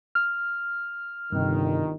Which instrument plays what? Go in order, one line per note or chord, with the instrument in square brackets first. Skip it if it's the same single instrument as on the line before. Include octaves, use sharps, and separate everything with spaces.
[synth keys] F6
[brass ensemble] G1 D#3 [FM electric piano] G2 C3